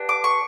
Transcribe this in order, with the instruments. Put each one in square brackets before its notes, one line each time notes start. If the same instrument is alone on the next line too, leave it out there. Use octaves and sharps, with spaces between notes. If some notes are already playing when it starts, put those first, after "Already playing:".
Already playing: [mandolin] B3 D4 G4
D6
C#6